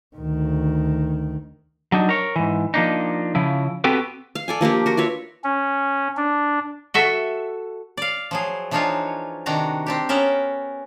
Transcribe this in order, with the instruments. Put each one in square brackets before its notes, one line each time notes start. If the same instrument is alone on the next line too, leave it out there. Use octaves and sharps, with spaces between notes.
[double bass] D2 D#3
[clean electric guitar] F#3 D4 D#4
A#4 C#5
G#2 E3
F3 A#3 D4 D#4
C#3 F3 E4
B3 C4 F#4 G4 A4 B4
[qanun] F5
A4 D5 G#5
F3 A#3 D4 G4
F#4 A#4
F4 B4 C#5 E5
[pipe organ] C#4
D4
[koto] F#4 A4 E5
D5 F5
F3 F#3 G#4
E3 F3 D4 D#4 F4 C#5
C3 D#3 D4 F#4 A#5
C4 D4 G4
B3 C#4 A#4 E5